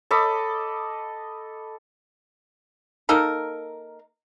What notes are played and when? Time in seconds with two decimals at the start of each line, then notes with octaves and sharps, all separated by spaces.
0.11 A4 D#5 B5 D6
3.09 A#3 D#4 A4 A#4